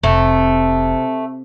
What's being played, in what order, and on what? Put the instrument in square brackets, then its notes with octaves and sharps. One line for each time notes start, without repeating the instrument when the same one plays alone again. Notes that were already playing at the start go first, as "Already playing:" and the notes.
[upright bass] F1 [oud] C3 [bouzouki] A3